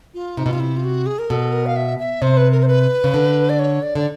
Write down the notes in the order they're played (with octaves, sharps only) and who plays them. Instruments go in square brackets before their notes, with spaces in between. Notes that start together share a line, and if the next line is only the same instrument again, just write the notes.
[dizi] F4
[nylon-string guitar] C3 [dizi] D#4
[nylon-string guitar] B2
[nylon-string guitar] C3 [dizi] F4
[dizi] E4
F4
F#4
G#4
A#4
[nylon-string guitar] B2 [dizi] A4
[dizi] A#4
F5
E5
E5
[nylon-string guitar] C3 [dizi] C5
[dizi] B4
A#4
C5
B4
[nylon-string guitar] C#3
D3
[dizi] D5
C#5
D5
[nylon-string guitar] D3 [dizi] D5